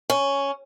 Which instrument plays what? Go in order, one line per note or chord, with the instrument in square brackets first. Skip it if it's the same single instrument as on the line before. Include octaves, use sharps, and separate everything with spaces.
[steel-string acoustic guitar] C#4